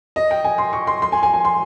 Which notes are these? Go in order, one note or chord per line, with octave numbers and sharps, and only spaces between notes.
D#5
G5
G#5
C6
C#6
C6
C6
G#5
G#5
G#5
C6